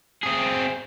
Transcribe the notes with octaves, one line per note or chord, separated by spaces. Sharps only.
C4 G#4